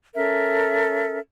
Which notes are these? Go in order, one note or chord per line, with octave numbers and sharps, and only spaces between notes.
C#4 A4 A#4 E5